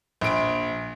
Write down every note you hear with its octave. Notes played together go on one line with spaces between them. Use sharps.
A#1 D7